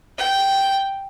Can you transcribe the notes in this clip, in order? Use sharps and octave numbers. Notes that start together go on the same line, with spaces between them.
G5